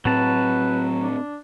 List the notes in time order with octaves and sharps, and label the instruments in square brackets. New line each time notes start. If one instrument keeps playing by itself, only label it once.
[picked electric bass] A2 C4 [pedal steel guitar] F#3 A5 [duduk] B4
[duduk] D4